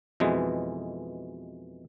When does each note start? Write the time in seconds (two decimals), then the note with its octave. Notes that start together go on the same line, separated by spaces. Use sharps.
0.20 F2 B2 E3 G#3